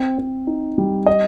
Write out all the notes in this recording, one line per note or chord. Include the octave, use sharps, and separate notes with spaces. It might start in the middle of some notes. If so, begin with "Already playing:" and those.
Already playing: C4
C4
D#4
G3
D#5